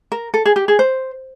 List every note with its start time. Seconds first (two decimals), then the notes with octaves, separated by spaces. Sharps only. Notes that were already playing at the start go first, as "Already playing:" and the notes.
0.12 A#4
0.34 A4
0.45 G#4
0.56 G4
0.68 G#4
0.79 C5